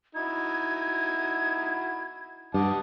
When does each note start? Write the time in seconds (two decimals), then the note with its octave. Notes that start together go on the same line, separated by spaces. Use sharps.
0.15 D#4 E4 F#4 G#6
2.54 G2 D#5 F#5 A5 D6